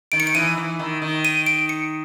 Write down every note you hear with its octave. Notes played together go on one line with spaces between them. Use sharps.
D#3 D7
C#7
D7
E3 D#7
E3
D#3
D#3
D#7
D7
C#7